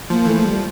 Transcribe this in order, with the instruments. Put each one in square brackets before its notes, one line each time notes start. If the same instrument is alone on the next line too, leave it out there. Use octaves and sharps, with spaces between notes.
[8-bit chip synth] F3 [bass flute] A#3
[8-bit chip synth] E3 [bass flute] A3
[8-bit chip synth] F3
[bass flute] G3